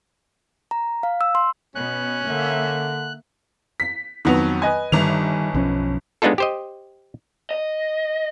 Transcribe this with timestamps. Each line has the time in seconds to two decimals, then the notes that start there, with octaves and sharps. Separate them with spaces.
0.71 A#5
1.03 F5
1.21 E6
1.35 C6
1.75 B2 B3 C#4 F#6
2.27 D3 A#3 E5
3.80 B6
4.25 F2 D#3 F#3 B3 F7
4.62 B4 D#5 G#5
4.92 G1 D#3 G3 F7
5.54 B1 F3 C#4
6.22 G#3 B3 D4 D#4 F4 A4
6.38 G4 C5 D#5
7.51 D#5